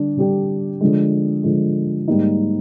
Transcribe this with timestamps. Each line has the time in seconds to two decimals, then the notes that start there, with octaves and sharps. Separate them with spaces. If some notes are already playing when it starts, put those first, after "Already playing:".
Already playing: D3 G3 D4
0.17 D3 G3 D4 G4
0.81 D3 F3 G#3
1.43 D3 F3 G#3
2.08 G#2 G3 A#3 D#4